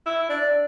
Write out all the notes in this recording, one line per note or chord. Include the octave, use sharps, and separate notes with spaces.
E4
D4